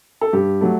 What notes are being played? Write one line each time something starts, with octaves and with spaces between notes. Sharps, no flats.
A4
G2 G4
F#3 A3